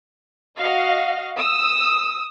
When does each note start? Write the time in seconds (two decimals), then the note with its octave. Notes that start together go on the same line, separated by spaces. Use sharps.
0.59 F#4 D#5 F5
1.37 D#6 E6